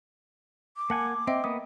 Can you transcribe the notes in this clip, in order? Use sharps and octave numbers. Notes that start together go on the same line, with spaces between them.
D6
A#3 F#5 G#5 A5
C4 D#5 E5 G5
A#3 B3 D6 D#6